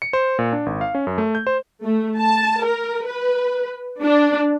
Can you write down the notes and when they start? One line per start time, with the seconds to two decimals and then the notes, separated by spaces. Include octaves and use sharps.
0.02 C#7
0.13 C5
0.39 A#2
0.53 D4
0.66 G#1
0.81 F5
0.95 C#4
1.07 F#2
1.18 A3
1.35 G6
1.47 C5
1.84 A3
2.19 A5
2.64 A#4
3.07 B4
4.03 D4